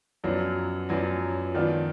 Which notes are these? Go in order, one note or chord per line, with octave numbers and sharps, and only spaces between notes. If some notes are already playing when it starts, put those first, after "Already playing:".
F#2 F3 F#3 B3 D4 F4
F#2 F3 F#3 B3 D4 F4
D#3 F3 B3 D4 F4